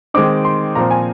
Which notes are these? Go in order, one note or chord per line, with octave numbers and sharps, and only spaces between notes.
D#3 G#3 C4 D#4 D6
C6
A#2 F3 C4 A#5
G#5